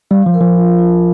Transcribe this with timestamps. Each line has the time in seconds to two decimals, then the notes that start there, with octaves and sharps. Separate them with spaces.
0.11 G3 F5
0.26 F3
0.34 A#4
0.41 F3
0.56 F4
0.78 F4